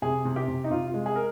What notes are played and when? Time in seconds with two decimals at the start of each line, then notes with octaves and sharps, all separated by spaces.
0.02 C3 G#4
0.25 C3
0.36 G4
0.48 C3
0.64 D#4
0.71 C3 F4
0.88 F4
0.94 G#3
1.06 G#4
1.16 A#4